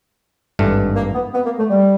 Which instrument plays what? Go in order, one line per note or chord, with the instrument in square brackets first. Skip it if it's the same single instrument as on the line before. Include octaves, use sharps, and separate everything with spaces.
[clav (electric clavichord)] G#1 G2 E3 A3
[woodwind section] A#3
B3
B3
A#3
A3
G3